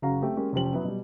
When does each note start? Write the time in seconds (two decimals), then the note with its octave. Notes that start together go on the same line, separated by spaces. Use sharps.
0.02 F#1 C#3 C#4 F#4 F5 A#5
0.22 A3 C4 G4
0.36 G#3 A#3 C#4 G4
0.53 F1 F3 C#4 G4 C5 F#7
0.73 F#3 B3 E4
0.84 B2 G3